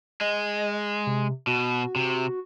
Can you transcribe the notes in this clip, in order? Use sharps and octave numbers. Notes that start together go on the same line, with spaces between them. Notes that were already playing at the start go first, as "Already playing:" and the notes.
G#3 D#5
C3
B2 F#4
C3